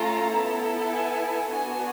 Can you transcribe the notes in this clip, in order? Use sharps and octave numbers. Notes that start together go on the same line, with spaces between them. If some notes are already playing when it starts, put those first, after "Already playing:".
Already playing: A3 C#4 F4 A4 A#5
B3 E4 A4
G#5
B3 D4 F#4 A4 G#5